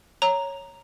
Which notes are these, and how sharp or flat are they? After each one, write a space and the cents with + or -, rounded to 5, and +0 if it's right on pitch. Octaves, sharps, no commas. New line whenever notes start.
C#5 +0 A#5 +0